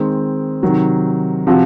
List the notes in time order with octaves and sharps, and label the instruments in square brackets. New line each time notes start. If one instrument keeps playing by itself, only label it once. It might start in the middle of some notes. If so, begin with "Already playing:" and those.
Already playing: [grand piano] D#3 G#3 C4
C3 D#3 F#3
C3 F3 C4 F#4